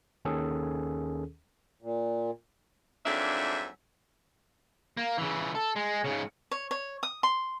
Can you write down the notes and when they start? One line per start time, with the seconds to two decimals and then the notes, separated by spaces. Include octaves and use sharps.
0.25 D#2 D#3 C#4 G#4 A4
1.82 A#2
3.06 F2 G#2 F#3 A#3 D4 E5
4.97 A#3
5.18 C#3 E3
5.55 A4
5.76 G#3
6.04 G#2 C#3
6.51 C#5
6.71 C#5
7.03 D#6
7.23 C6